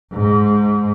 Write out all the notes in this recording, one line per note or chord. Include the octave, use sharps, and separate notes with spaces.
G#2